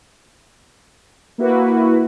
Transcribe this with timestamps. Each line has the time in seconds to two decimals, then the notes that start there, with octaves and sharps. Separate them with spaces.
1.38 A#3 E4 F#4 B4